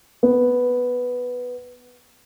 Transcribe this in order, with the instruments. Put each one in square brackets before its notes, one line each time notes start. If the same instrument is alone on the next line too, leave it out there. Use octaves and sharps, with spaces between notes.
[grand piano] B3